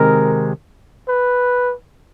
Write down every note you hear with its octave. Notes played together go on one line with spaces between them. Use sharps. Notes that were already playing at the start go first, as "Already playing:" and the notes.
Already playing: C3 D#3 G#3 A#4
B4